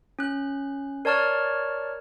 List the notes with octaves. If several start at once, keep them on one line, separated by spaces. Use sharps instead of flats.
C#4 F#6
A#4 C#5 D5 A5 C#6 F6